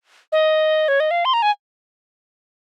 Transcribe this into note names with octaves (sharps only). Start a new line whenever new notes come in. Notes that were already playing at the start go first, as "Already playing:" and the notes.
D#5
C#5
D#5
F5
C6
A#5
G#5